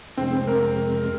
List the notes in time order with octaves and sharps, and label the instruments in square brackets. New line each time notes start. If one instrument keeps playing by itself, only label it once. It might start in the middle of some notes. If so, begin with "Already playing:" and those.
[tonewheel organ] F2 C3 G#3 [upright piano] C4
[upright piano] C4
A#4